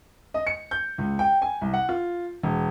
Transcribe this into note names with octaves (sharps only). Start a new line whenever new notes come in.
D#5
C#7
G6
C#2
G5
G#5
C2
F#5
F4
E1